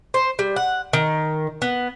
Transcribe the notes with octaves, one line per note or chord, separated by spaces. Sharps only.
C5
G3
F#5
D#3
B3